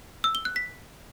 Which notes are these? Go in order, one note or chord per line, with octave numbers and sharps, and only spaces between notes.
E6
G7
F#6
B6